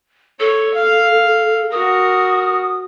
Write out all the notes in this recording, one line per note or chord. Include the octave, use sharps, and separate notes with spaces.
A4 C#5
F5
F#4 A#4 D#6